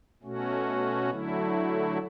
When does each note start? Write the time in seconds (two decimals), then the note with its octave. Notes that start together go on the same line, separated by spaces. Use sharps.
0.22 B2 A3 C#4 F#4
1.10 D3 F#3 A3 E4